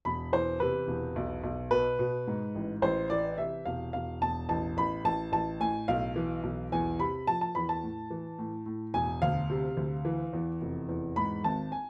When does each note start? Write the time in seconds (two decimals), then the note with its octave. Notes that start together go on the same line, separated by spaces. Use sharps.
0.05 E1 B5
0.33 E3 C5
0.60 C3 B4
0.87 E1
1.16 B1
1.43 B1
1.71 B2 B4
1.99 B2
2.27 G#2
2.55 A1
2.82 A1 C5
3.10 E3 D5
3.38 C3 E5
3.65 E1 F5
3.93 E1 F5
4.21 E1 A5
4.49 A1 A5
4.77 A1 B5
5.05 A1 A5
5.32 A1 A5
5.60 A2 G#5
5.88 B1 F5
6.16 E3
6.43 B1
6.72 E2 G#5
6.99 C3 B5
7.27 F3 A5
7.41 A5
7.55 E2 B5
7.69 A5
7.83 A2
8.10 E3
8.39 A2
8.66 A2
8.94 E1 G#5
9.22 D2 F5
9.50 C3
9.77 D2
10.05 E3
10.33 E2
10.61 F1
10.89 E2
11.16 G#2 B5
11.44 G#1 A5
11.72 G#5